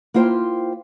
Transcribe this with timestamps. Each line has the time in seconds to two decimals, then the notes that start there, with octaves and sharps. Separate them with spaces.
0.14 A#3 E4 F4 C5 G5